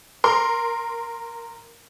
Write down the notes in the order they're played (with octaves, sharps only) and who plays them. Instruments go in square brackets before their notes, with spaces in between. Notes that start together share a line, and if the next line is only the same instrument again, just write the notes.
[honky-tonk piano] A#4 C6